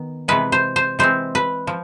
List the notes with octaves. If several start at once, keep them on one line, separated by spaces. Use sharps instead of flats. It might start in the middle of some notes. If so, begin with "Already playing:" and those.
Already playing: D#3 B3
C3 E3 G#3 B4
C5
C5
E3 G#3 C4 C5
B4
F3